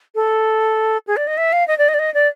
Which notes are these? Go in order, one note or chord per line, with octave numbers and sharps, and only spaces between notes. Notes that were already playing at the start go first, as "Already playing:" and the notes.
A4
G#4
D5
D#5
E5
F5
D#5
D5
D#5
D5
D#5
D5